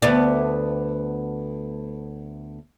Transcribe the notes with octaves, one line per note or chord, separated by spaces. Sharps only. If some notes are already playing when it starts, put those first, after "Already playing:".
D2 B3 D5